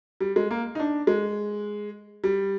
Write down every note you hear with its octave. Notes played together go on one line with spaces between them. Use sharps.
G3
G#3
A#3
D#4
D4
G#3
G3